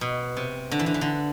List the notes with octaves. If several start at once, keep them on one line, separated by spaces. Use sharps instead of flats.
B2
C3
D3
E3
D3
E3
D3